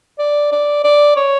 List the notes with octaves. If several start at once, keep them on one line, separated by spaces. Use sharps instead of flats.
D5
D5
D5
C#5